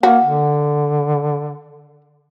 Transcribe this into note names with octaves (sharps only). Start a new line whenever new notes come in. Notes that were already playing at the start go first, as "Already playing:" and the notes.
A#3 F#4
D3